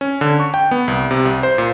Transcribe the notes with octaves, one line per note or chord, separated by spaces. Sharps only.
C#4
D3
C#6
G5
B3
C2
C3
C2
C5
A#2